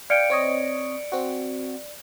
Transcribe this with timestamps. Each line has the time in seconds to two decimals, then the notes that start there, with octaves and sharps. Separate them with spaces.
0.10 D5 F5 G5 C#7 D7
0.30 C4 C#5 D#5
1.12 C4 F#4